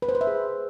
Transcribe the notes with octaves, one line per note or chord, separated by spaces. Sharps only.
B4
C5
B4
E5
G#4